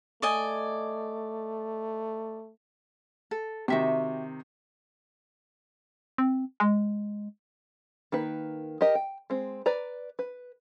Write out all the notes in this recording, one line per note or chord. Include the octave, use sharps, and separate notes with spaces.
A3 D5 D#5 G#5
A4
C3 D#3 F#4 E5 G5
C4
G#3
D#3 A#3 B4
G4 A#4 D#5
G5
G#3 C4
B4 D5 A#5
B4